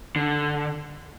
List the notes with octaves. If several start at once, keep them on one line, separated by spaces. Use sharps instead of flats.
D3